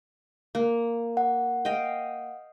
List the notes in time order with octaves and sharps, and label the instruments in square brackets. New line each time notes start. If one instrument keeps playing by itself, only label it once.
[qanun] A#3
[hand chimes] F#5
[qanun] D#5 F5 G5